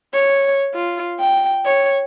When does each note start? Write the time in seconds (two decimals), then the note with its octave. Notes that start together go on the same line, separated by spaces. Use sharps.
0.14 C#5
0.75 F4
1.20 G5
1.65 C#5